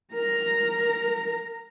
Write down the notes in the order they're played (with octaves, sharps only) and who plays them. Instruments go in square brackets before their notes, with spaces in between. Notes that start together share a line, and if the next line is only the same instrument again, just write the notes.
[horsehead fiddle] A#4 A#5